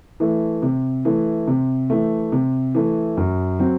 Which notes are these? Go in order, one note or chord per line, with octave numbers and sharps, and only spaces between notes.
E3 A3
C3
E3 A3
C3
E3 A3
C3
E3 A3
F#2
F#3 C4